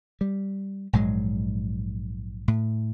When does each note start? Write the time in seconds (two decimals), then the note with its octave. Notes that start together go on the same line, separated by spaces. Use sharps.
0.21 G3
0.93 A#1 G#2 F#3 G#3
2.48 A2